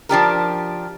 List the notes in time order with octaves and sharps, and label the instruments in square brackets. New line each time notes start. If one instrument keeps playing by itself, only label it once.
[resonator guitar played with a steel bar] F3 D4 G4 A#4